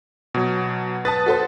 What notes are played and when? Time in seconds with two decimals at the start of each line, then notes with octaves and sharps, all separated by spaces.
0.34 B2 F#3
1.05 B4 A5 D#6 A6
1.26 F#4 A4 C5